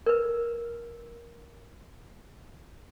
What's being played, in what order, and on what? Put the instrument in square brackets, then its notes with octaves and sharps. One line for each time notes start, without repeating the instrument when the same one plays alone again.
[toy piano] A#4 B4